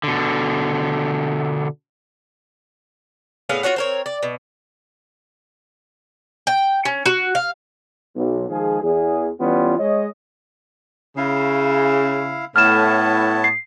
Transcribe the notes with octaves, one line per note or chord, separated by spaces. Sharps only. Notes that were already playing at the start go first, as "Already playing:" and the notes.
B2 D3
A2 B3 G#4 F5
F4 F#4 C#5 F#5
C4 A#4 C#5
D5
B2
G5
C#4
F#4
F5
B1
D#3 F3 G#3 G#4
E2 G#4
E3 G3 B3 C#4 F4
G#3 C#5 D#5
C#3 E4 F5
A2 B3 C#5 A5 F6 E7
C7